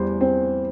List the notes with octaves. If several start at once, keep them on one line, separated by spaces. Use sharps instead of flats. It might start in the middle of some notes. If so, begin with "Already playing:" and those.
Already playing: E2 G3 C5
C4